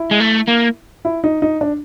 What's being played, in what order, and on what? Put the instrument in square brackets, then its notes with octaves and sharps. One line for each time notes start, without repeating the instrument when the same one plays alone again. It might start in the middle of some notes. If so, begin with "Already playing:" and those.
Already playing: [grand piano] E4
[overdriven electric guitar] G#3
A3
A#3
[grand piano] E4
D#4
D#4
D4